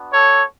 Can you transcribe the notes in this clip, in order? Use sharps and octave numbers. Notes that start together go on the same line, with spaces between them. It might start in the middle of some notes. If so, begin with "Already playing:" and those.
Already playing: B3 D4 F#4
A4 C#5